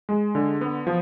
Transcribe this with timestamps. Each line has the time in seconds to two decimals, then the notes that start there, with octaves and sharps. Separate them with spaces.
0.09 G#3
0.35 D3
0.61 B3
0.87 F3